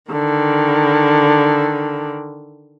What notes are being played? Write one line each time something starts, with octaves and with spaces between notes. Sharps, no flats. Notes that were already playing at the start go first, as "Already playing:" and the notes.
D3 D#3